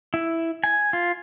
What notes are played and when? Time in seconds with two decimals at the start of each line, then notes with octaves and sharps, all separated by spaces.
0.14 E4
0.64 G#5
0.93 F4